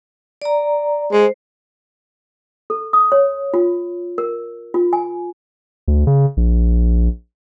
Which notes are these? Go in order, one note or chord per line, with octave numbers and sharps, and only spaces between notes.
D5 A#5
G#3 C5
A4
D#6
C#5
F4
A#4
F4
G#5
D2
C#3
A#1